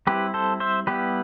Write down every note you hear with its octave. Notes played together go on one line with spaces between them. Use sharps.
G3 C4 E4 G4 B4
A4 C5
C5 E5
G3 B3 E4 G4 B4